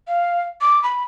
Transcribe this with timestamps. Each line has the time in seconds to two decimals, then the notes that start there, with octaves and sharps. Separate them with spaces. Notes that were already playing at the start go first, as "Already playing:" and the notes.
0.07 F5
0.61 D6
0.83 B5